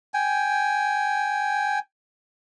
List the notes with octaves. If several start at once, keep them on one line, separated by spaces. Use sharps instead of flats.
G5 G#5